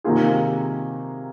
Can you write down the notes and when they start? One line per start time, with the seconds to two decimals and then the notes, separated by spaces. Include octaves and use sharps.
0.04 C3 D#3 A#3 F4 G#4